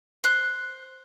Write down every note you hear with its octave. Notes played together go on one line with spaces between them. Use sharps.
C5 F#6